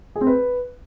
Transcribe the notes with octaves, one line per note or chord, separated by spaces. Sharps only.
G#4
C4
B4